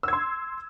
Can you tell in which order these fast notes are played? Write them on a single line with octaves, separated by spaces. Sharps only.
E6 G#6 C6